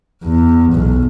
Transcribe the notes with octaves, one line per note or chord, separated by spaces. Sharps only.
E2
B1